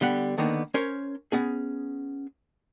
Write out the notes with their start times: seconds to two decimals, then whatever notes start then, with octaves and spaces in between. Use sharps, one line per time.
0.01 D3 G3 B3 F#5
0.38 D3 D#3 A#3 B3 D#4
0.74 C#4 A#4 C5 C#5
1.32 B3 C#4 G#4